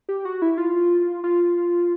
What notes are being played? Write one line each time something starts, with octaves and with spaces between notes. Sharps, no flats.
G4
F#4
E4
F4
F4